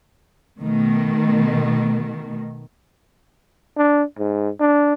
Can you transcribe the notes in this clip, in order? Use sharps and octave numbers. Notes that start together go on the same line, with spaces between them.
B2 D#3 A3
D4
G#2
D4